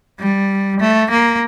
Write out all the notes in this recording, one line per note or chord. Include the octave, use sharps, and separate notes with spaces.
G3
A3
A#3